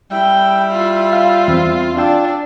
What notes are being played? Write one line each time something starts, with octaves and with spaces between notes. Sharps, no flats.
G3 E4 E5 G5
F4
F5
E2 C4
D4 F4 G5 E6